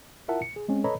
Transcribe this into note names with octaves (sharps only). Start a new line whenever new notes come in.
E4 F4 A#4 E5 F#5 A5
C#7
G#4
G#3 C4 C#4
A4 B4 C#5 D#5 A#5 B5